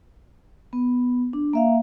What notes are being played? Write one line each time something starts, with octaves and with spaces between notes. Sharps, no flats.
B3
D4
A#3 E5 F5